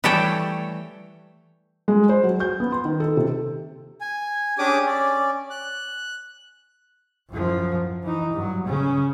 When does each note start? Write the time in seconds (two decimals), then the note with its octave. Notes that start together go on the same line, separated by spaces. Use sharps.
0.04 E3 G3 A3 A4 C#5 G5
1.88 G#3
2.09 C5
2.23 F#3
2.40 G6
2.60 B3
2.72 C6
2.85 D#3
3.00 A4
3.17 C3
4.01 G#5
4.58 C#4 D4 G4 G#4 D6 D#6
4.86 C#4 D5
5.50 F#6
7.30 F#2 F3
8.03 E3 D#4
8.33 G2 F#3
8.66 C#3 C#4